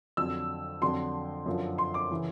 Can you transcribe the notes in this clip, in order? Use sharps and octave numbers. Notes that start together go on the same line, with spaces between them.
F2 D3 F#3 E6
F2 D3 F#3 C6
F#2 D3 F3
C6
D6
C#3 E3